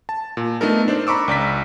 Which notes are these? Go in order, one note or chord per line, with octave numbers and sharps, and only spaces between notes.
A5
A#2
A3 B3 D4 D#4 A4 A#4
D4 C5 D5
A#5 B5 C#6 D6 E6
C#2 D5 A#5 B6